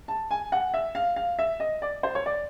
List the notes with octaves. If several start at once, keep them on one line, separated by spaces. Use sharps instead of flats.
A5
G#5
F#5
E5
F5
F5
E5
D#5
D5
C5
C#5
D5